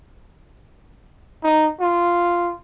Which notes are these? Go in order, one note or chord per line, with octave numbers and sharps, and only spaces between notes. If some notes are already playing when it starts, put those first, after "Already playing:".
D#4
F4